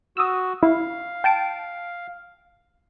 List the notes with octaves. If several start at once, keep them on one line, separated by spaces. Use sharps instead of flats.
F#4 D#6 E6
E4 F5
G5 A5 D7